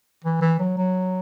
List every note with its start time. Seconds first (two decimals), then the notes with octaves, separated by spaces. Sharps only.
0.25 E3
0.41 E3
0.60 F#3
0.78 F#3